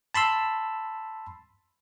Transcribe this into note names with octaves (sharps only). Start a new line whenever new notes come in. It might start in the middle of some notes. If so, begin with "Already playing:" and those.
A5 B5 C6 E6